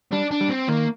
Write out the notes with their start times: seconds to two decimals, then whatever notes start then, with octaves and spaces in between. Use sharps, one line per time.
0.12 G3 D4
0.31 D4
0.41 G3
0.49 C4
0.68 D#3 A#3